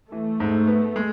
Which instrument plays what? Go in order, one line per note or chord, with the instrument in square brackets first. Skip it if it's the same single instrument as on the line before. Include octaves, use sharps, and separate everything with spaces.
[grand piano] E3 [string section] A3
[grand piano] G#2
B3
G#3